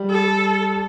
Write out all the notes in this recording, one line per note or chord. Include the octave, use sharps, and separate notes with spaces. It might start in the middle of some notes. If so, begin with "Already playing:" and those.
Already playing: G3
A4